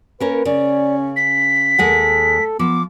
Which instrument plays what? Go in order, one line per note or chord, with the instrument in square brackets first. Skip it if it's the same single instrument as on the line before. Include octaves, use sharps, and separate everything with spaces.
[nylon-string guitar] A#3 C#4 A#4 [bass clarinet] B4
[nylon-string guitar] C#3 [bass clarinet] C#4 [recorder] D5
[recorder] B6
[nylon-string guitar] D#2 G#3 F#5 [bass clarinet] A4
[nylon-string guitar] F3 [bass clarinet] B3 [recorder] D6